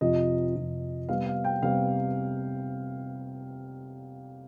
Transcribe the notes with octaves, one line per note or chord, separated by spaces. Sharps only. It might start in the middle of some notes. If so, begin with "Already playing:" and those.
F2 C3 F3 D#5
F2 C3 F3
C3 G3 B3 F5
F5
G5
C3 G3 B3 F5